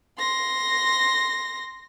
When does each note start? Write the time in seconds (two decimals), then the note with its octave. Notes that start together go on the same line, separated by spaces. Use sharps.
0.19 C6 A#6